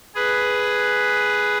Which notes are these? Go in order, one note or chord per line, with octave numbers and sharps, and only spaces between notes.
G#4 B4